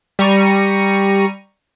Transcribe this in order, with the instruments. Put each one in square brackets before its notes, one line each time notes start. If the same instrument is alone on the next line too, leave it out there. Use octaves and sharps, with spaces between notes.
[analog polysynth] G3 A#5 C#6 D#7